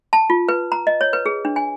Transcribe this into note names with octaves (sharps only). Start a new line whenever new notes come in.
A5
F4
B4
A#5
D#5
C#5
B4
G#4
D4
G#5